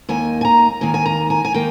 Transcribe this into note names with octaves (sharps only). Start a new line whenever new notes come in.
D#2 D#3 A#3 G#5
G#5
A#5
D#2 D#3 A#3 G#5
G#5
A#5
G#5
G#5
D#3 A#3 G5